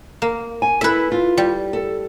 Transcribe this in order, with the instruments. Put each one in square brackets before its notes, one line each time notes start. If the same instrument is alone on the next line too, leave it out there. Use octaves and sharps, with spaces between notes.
[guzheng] A#3
[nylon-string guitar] G#5
[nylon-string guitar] E4 A4 [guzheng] B4 E5
[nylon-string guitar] F4
[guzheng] G3
[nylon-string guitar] A4